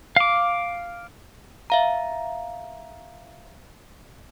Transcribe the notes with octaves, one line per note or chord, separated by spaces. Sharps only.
F5 D6
E5 F5 A#5